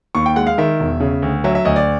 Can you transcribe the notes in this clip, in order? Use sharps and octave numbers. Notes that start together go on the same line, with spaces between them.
D#2 C#6
G5
G#3 F#5
F5
D#3 E5
E1
C#3
D2
F#3 E5
E5
D2 D#5
D5